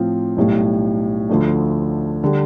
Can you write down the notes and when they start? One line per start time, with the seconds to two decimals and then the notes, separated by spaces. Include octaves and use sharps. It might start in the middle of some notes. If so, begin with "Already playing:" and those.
Already playing: A2 F3 C4 F4
0.36 B1 A2 G3
1.29 D2 D3 F3 A3 D4
2.24 D3 G3